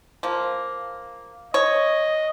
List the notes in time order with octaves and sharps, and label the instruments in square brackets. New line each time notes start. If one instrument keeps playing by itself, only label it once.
[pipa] F3 A#3
[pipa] C#5 [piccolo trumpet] D#5